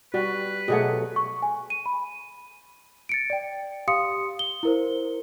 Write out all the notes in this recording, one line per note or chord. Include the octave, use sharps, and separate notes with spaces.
G3 F#4 B4
B2 F#3 A3 G4 G#4 F#5
C#6
G#5
D#7
B5
A6 C#7 D7
D5 G5
G4 F5 C6 D#6 C#7
G7
E4 A#4 C5